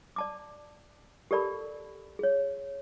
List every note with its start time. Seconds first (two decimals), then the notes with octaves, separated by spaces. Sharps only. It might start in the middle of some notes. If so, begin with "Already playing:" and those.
0.16 D5 A5 D6
1.31 G4 A4 A#4 D5 A5 B5
2.19 G#4 C#5